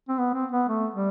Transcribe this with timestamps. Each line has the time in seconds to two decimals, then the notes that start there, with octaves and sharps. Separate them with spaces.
0.09 C4
0.18 B3
0.34 C4
0.52 B3
0.69 A3
0.94 G3